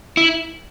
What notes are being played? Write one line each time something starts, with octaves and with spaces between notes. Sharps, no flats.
E4